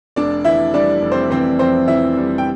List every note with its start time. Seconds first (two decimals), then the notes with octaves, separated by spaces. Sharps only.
0.16 F1 D4 D5
0.45 E3 E4 E5
0.74 G3 D4 D5
1.02 F1
1.12 C4 C5
1.30 E3 C4 C5
1.59 F2 C4 C5
1.88 E3 E4 E5
2.17 G3
2.38 G5